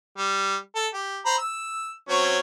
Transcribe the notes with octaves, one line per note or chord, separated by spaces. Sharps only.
G3
A4
G4
C5 A#5 B5
E6
F#3 C4 C#4